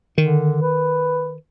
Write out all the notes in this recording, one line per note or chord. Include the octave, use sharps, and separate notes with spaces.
D3 D#3
B4